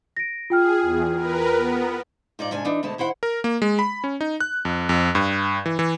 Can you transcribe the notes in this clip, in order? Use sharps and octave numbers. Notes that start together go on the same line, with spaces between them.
A#6 D7
F4 G#4 G5 F6
E2
A#4 B4
B3
G#2 D#4 F4 D5
G#2 C3 D4 G#5
E3 D4 D#4
D2 B2 G#3 A3 A5
D#3 E4 C5 F#5
A#4
A#3
G#3
B5
C#4
D#4
F#6
F2
F2
G2
E3
E3